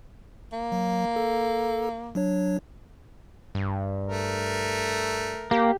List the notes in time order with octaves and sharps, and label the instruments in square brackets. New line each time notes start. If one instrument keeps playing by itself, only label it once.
[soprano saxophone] A#3
[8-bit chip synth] F#3
A4
F#3 D4 C#5
[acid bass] G2
[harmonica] A3 A#4
[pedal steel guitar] A#3 [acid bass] G4